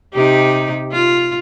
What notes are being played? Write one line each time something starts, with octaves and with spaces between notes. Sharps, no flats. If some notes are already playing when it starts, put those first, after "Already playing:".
C3 D#4 G4
F4